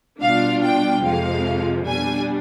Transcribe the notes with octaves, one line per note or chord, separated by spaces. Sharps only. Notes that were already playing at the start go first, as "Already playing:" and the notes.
B2 G3 D4 F4 F5
G5
F2 C3 F3 G#3 F5
B2 G3 D4 G#5